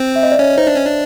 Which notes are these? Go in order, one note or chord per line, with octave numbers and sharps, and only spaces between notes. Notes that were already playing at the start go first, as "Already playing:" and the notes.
Already playing: C4
E5
D#5
D5
C#4 C#5
D#4 C5
D4
C#4
D4